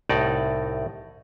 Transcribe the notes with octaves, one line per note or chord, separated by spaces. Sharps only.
C2 A2 D#4 D5